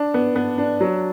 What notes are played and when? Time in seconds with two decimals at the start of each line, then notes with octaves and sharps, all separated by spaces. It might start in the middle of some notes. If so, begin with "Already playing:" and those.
Already playing: D4
0.14 B3
0.36 B3
0.58 D4
0.81 F#3